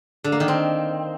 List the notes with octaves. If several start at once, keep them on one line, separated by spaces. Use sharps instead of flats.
D3
A#3
D#3
C4